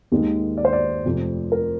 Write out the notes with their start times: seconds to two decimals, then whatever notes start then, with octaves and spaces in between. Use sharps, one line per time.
0.12 D#2 D#3 G#3
0.57 D5
0.65 C5
0.73 D5
1.05 F1 F2 C3
1.52 A#4